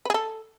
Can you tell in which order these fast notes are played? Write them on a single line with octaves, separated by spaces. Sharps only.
B4 G#4 A4